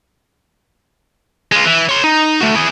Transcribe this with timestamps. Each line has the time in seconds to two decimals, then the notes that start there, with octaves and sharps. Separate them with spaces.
1.52 G#3 F4
1.65 E3
1.89 C#5 C6
2.04 D#4
2.41 A3 F#4
2.55 E4 G#4